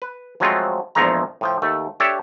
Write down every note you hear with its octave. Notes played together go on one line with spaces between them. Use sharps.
B4
F3 F#3 G#3 A3 C4 F4
A#1 E2 F3 G#3 A3 A#5
A2 F3 G5
D#2 A3
D4 G4 A4 C#5 E5